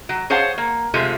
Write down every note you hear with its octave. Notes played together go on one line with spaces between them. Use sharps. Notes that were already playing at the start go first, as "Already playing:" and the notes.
F#3
G#4 C5 C#5 F5 F#5 A5
A#3
C3 F3 G#3 A3